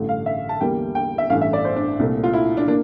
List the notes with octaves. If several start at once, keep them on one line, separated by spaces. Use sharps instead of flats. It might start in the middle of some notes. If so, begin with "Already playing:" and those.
Already playing: A1 G2 D3 A3
F5
E5
A5
E2 D3 G3 A#3 G5
G5
E5
A1 G2 E3 A3 F5
E5
D5
C5
D4
C2 A#2 A3
F4
E4
D4
A#3 D4